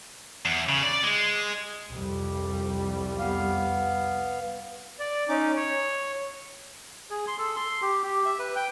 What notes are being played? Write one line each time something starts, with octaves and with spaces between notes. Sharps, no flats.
E2
C#3
D5
G#3
C2 F2 G3
B3 F5
D5
C#4 D#4 D6
C#5
G#4
C6
A4
C6
G4
G4
E5
B4
G5